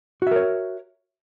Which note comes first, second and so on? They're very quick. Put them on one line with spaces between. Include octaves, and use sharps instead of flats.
F#4 E5 A#4 C#5